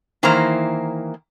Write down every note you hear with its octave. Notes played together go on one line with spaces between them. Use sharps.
D#3 E3 A#3 E4 C5 A#5